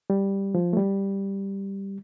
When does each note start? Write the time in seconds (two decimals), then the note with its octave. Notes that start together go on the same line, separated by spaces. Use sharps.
0.10 G3
0.55 F3
0.73 A3
0.77 G3